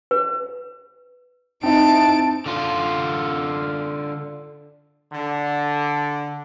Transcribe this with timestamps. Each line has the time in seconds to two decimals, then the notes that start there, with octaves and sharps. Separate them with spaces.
0.11 B4
1.63 C4 D#4 E4 A5 D7
2.46 D3 F4
5.13 D3